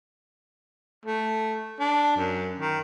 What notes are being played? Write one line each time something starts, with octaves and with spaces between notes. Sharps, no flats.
A3
D4
F#2
D#3